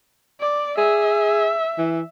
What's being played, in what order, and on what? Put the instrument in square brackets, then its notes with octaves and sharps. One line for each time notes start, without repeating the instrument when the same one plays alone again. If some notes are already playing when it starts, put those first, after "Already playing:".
[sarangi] D5
[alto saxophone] G#4 [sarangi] E5
[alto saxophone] E3